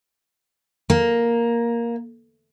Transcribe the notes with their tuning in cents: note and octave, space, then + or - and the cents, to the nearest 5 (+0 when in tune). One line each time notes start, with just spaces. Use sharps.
A#3 +5